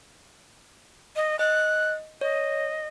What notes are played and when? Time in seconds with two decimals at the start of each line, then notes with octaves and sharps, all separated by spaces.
1.16 D#5
1.39 D#5 F#6
2.21 C#5 D#5